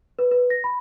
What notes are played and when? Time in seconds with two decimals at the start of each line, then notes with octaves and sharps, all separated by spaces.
0.19 B4
0.31 B4
0.50 A#6
0.64 B5